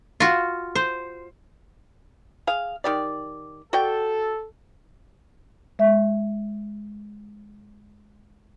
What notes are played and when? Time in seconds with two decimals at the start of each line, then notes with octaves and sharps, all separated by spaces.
0.20 F4 F#4
0.75 C5
2.47 G#4 F5
2.84 D#3 G4 D5
3.73 F#4 A4 D5 G5
5.79 G#3 E5